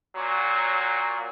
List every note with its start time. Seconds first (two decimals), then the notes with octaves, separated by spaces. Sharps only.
0.15 A#2 F#3